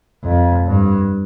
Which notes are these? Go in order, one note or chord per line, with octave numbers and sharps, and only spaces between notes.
F2
G2